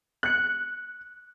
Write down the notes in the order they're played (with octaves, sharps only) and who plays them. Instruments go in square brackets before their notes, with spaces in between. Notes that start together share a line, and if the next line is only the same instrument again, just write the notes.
[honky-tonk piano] F#6 C#7